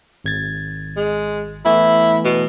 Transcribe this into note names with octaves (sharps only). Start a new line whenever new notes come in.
G#1 G#6 A6
G#3
E3 A3 B3 E4
B2